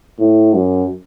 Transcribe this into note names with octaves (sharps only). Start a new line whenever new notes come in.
A2
F#2